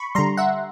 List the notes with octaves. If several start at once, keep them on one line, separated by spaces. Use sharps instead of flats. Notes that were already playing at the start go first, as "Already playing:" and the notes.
Already playing: B5 C#6
D3 G3 A#5 C6
E5 F#5